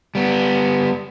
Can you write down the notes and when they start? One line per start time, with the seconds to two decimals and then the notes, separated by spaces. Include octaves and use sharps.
0.15 G3 B3